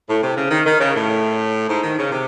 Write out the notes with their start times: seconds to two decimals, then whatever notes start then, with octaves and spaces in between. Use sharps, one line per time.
0.09 A2
0.23 C3
0.36 C#3
0.50 D#3
0.65 D#3
0.80 C#3
0.95 A2
1.68 G#2
1.83 D#3
1.98 C#3
2.12 C3